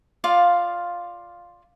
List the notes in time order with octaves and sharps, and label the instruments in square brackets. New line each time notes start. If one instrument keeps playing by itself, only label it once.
[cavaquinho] F4 D5 F5